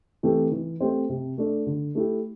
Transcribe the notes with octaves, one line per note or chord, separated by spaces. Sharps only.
E3 A3 C4 G4
E3
A3 C4 G4 C5
C3
A3 D4
D3
A3 E4 G4